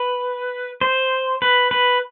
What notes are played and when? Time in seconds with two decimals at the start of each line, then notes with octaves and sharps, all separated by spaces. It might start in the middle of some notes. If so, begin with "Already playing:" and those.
Already playing: B4
0.81 C5
1.42 B4
1.71 B4